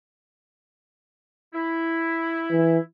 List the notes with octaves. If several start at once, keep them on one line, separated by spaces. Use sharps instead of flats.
E4
E3